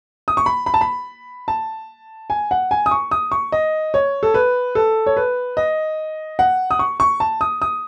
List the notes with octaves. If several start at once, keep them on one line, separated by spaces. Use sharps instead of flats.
D#6
C#6
B5
B5
A5
B5
A5
G#5
F#5
G#5
D#6
C#6
D#6
C#6
D#5
C#5
A4
B4
A4
C#5
B4
D#5
F#5
D#6
C#6
C#6
A5
D#6
D#6